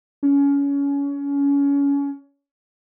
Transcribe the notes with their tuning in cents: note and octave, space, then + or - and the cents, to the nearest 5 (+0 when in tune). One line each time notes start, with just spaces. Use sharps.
C#4 +25